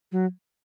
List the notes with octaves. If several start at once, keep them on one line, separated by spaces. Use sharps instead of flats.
F#3